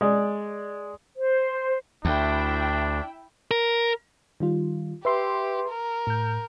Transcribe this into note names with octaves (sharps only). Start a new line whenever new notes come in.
G#3 D5
C5
D2 D4 E4 E5 G5
A#4
D#3 G3 F4
G4 B4 E5 C6
A#4
A2 G6